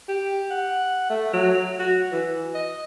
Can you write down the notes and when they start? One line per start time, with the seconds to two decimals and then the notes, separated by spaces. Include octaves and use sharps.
0.09 G4
0.51 F#5
1.10 A3
1.34 F#3
1.79 F#4
2.12 E3
2.55 D#5